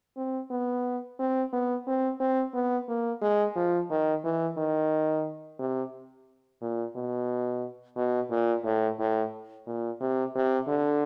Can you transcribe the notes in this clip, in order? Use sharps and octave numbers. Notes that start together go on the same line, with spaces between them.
C4
B3
C4
B3
C4
C4
B3
A#3
G#3
F3
D#3
E3
D#3
C3
A#2
B2
B2
A#2
A2
A2
A#2
C3
C3
D3